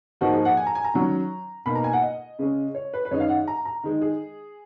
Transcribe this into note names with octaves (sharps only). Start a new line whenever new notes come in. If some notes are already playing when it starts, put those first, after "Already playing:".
G#2 F3 A#3 D#4 F#4
G#4
F#5
G#5
A#5
G#5
A#5
D#3 F#3 C#4
B2 A#3 D#4 B5
A#5
G#5
F#5
D#5
C#3 G#3 C#4
C#5
B4
B4
F#2 D#3 G#3 D#4 C#5
F5
F#5
A#5
A#5
D#3 G#3 D#4
G#4